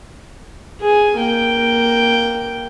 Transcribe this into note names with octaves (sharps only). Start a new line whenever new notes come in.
G#4 G#5
A#3 G5